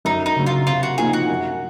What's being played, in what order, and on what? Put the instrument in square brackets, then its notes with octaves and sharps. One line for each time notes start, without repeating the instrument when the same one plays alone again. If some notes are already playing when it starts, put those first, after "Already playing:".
[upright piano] F#2 [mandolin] D#4
[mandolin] D#4
[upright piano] C#3 F#3
[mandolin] F4
[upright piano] C3 [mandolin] F4
[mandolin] F#4
[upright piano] F3 A#3 D#4 [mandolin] G#4
[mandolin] F#4
[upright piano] F#2